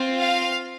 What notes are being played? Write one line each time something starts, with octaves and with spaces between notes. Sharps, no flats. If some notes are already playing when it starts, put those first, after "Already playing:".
Already playing: C4 F4
F5